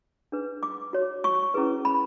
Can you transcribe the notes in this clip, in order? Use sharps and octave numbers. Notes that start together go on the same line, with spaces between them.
D4 G#4 B4
D6
F#4 C#5
C#6
C#4 E4 G#4 B4
B5